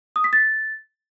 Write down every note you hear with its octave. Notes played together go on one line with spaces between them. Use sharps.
D#6
B6
A6